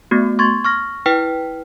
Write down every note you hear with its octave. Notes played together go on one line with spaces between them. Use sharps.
A3 B3 F#4
C6 C#6 G#6 A6
C#6 F6 A#6
E4 B4 G5 F6 B6